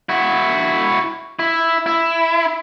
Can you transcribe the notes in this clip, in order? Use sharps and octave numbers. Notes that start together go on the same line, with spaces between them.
E4 F#4
E4
E4